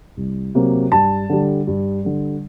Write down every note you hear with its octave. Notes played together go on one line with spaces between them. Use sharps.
C2
C3 F#3 A#3
G2 A5
D3 G3
G2
D3 G3